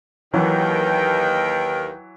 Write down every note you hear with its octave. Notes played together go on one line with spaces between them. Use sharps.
D#2 D#3 E3 F#3 B4 G5